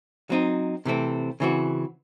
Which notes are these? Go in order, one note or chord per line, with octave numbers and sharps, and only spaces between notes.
F#3 C4 D#4
C3 E3 A3 C4
C#3 E3 C4 F#4